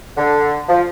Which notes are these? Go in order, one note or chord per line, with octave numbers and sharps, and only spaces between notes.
D3
F3